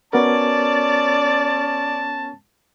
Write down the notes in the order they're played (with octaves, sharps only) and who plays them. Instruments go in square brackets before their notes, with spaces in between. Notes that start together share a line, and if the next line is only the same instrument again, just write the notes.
[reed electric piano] B3 F#4 A#4 [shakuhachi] C#4 [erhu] D5 [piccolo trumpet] A5